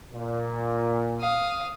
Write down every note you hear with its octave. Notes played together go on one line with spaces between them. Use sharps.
A#2
F5 D#6